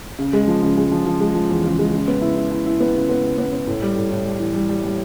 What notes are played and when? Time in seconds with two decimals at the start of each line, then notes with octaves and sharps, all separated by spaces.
0.19 C#3
0.33 G#3
0.48 F3
0.63 C#3
0.77 G#3
0.92 F3
1.06 F3
1.21 G#3
1.35 F3
1.50 E2
1.64 C#3
1.79 G#3
1.93 C#3
2.08 B3
2.22 E4
2.37 E4
2.51 E4
2.66 E4
2.80 B3
2.95 C#3
3.09 B3
3.23 C#3
3.38 B3
3.53 B3
3.67 A2
3.82 G3
3.96 A2
4.10 A2
4.25 G3
4.40 E3
4.54 G3
4.69 G3
4.84 G3